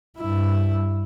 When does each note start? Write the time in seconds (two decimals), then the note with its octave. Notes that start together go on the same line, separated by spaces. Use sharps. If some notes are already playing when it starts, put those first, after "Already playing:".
0.18 G2 E4